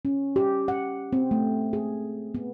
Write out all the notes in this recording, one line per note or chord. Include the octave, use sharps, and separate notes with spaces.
C#4
G4
F#5
C4
A3
G#4
B3